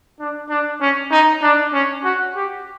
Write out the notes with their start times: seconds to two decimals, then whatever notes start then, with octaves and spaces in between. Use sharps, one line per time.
0.20 D4
0.50 D4
0.81 C#4
1.11 D#4
1.42 D4
1.73 C#4
2.04 F#4
2.36 G4